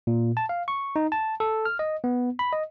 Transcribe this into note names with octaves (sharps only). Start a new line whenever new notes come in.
A#2
A5
F5
C#6
D#4
A5
A4
F6
D#5
B3
B5
D#5